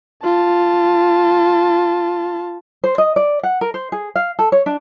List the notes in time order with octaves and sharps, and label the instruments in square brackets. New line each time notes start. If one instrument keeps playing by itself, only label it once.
[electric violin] F4 A5
[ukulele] C5
D#5
D5
F#5
A#4
C5
G#4
F5
A4
C#5
D4